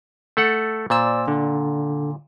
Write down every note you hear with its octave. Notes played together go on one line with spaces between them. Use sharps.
A3 A4 F#5
A#2 C5 D5 E6
D3